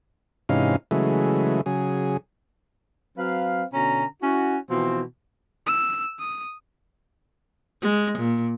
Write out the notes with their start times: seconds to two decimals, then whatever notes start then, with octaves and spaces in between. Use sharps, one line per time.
0.49 G#2 C3 E3 C#4 D#4 F5
0.91 C#3 E3 F#3 G#3 A3
1.66 C#3 F#3 G#4
3.18 F#3 C4 B4 F5
3.73 B2 D3 C#4 A#5
4.23 C#4 E4 F#4
4.70 B2 E3 F3 C4
5.67 E6
6.19 D#6
7.82 G#3
8.19 A#2